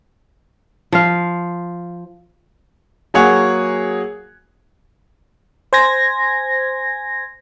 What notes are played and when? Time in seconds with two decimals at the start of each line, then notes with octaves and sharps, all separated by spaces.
0.92 F3 F5
3.14 F#3 A#3 G#4 C#5 F#5
5.73 C5 G#5 G#6 A#6